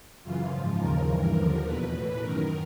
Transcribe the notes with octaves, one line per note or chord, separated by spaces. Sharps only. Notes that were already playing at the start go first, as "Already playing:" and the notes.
F#2 C#3 E3 F4
G#2 F3
D#2 C#3 F3 A#4
G2 E3
D#2 D3 F3
E2 B2 B4
A2 E3
F#2 D#3 A#4